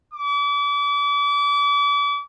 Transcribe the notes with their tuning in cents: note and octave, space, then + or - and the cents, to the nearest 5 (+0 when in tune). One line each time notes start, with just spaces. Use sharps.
D6 -35